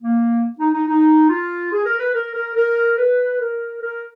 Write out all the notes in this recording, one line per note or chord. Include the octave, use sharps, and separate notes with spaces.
A#3
D#4
D#4
D#4
F4
G#4
A#4
B4
A#4
A#4
A#4
B4
A#4
A#4